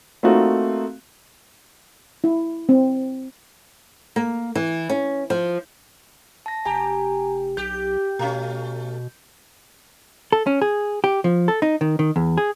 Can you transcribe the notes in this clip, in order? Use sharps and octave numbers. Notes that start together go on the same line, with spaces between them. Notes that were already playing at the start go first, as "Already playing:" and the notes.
A3 A#3 C4 D#4 F4 F#4
E4
C4
A#3
E3
C#4
F3
A5 A#6
F1 G4 G#5 A#5
B1 G4 G6
B2 A3 C#4
A4
C#4
G#4
G4
F3
A4
D#4
D#3
D#3
E2
G#4